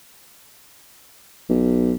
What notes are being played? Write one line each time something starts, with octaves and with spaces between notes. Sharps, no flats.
B1